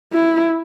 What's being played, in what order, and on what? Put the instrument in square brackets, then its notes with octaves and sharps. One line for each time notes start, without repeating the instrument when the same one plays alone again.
[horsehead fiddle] E4